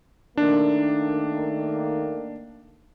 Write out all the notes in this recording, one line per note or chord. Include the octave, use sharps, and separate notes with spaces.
D#3 A3 A#3 D4